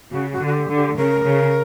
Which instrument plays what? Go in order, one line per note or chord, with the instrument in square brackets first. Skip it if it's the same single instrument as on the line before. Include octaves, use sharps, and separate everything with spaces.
[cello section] C#3 [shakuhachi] F#4
[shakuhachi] F#4
[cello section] D3
[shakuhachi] F#4
G4
[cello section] D3
[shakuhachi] G4
[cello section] C#3 [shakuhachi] A#4
[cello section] C#3